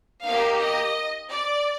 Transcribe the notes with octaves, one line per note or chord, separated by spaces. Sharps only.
A#3 D#4 G4 F5
D#5
D5